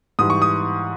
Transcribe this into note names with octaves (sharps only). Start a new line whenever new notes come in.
G#2 E3 G3 D#6
C#6
D#6